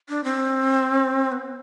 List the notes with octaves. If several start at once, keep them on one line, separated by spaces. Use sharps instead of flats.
D4
C4
B3